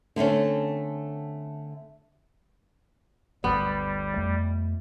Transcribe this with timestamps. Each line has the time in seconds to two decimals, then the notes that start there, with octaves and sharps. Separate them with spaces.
0.16 D3 A3 C4 C#4
3.44 G1 D2 G3 B3
4.16 F2 A3